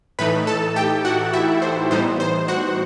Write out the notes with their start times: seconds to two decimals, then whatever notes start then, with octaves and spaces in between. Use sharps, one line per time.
0.19 A2 E3 A3 D#4 B4 B5
0.47 A4 A5
0.76 G4 G5
1.05 F#4 F#5
1.33 E4 E5
1.62 C5
1.91 A2 E3 G3 B3 D#4 C5
2.20 C5
2.48 F#4 F#5